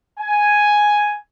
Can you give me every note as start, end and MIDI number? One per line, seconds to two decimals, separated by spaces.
0.20 1.17 80